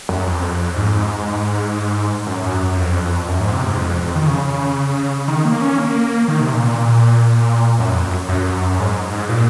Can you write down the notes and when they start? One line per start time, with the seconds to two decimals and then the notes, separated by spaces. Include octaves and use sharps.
0.09 F#2
0.26 F2
0.76 G#2
2.27 F#2
2.44 F#2
2.60 F#2
2.77 F2
3.27 F#2
3.40 G#2
3.53 C3
3.65 G#2
3.78 F2
3.90 F2
4.02 F2
4.15 D#3
4.27 C#3
5.28 D#3
5.45 A#3
5.61 C#4
5.78 A#3
6.28 D#3
6.41 C3
6.53 A#2
6.66 A#2
7.79 F#2
7.91 F2
8.04 F#2
8.29 F#2
8.72 F#2
8.79 G#2
9.29 A#2